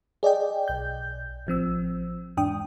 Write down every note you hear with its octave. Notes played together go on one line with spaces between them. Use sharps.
G#4 D5 D#5 G5
B1 G6
A1 F3 C4 E6
E2 G#2 D4 G5 D#6